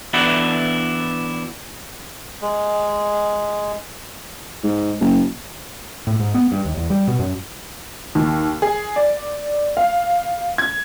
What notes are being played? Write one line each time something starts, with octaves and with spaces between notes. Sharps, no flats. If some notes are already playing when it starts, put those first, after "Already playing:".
E3 B3 D4 E4 F#4 A4
G#3
G#2
F#1
A2
G#2
B3
G2
D#2
E2
G3
B2
F#2
D#2
G#4
D5
F5
G#6